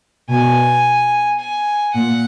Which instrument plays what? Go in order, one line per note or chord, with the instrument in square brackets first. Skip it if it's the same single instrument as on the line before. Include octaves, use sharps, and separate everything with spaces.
[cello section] B2 [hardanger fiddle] G#5
[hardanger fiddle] G#5
[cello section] A#2 [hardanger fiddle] F#5